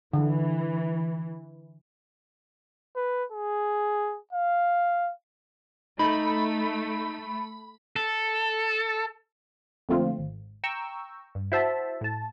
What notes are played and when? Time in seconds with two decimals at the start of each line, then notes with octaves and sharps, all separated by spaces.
0.13 D3 E3
2.96 B4
3.32 G#4
4.33 F5
5.99 A3 D#4 B5
7.96 A4
9.89 F2 A#2 D3 A3 C4 F4
10.19 G#1
10.64 G5 A#5 C#6 E6
11.35 G2
11.52 E4 F#4 C5 E5 A5
12.01 A2 A5